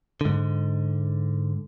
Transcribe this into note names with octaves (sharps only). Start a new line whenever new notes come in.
G#2 D3